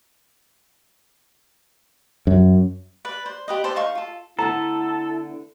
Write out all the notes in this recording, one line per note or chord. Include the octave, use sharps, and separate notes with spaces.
F#2
B4 D5
C5
G4 B4 D#5
A4 C5 D5
D#4 F5 C6 C#6
F4 A4
D3 A3 B3 E4 A4 A#5